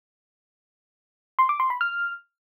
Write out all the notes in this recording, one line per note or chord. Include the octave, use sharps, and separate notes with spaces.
C6
D6
C6
B5
F6